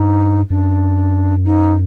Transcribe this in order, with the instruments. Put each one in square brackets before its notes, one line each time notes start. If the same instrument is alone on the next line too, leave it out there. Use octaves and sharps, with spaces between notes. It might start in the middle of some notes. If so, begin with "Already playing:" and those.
Already playing: [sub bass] G2 [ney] D#4
[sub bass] F#2 [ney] D4
[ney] D#4